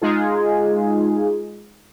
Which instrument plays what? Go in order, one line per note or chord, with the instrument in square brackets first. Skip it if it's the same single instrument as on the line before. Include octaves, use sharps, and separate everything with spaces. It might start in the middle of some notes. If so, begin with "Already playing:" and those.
[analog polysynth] G#3 D#4 F4 G#4